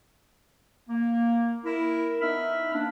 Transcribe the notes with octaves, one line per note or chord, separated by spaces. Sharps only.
A#3
E4 A#4
B3 D#4 E5 B5 F6
A#3 D4